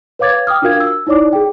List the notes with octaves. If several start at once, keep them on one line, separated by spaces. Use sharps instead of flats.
B4 C#5 F5 D6 G#6 A6
G5 D6 D#6 F6
D4 F4 F#4 A#4 F5 G#6
E6
D#4 E4 C#5 D5 D6
G#4 G5